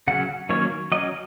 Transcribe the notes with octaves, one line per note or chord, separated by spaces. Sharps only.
C#3 F#3 C#4 F#5
D#3 F#3 A#3 C#4 C#5
F#3 C#4 D#5